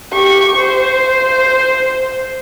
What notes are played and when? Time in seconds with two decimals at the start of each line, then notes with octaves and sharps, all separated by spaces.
0.12 G4 C#6
0.56 C5